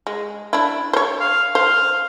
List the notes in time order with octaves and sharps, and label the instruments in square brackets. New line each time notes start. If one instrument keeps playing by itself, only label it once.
[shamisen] G#3
D4 E4
C5 C#5
[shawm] F5
[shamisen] C5 [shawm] F5